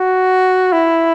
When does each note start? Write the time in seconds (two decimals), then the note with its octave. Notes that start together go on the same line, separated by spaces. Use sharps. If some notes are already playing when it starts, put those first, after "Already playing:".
Already playing: F#4
0.73 E4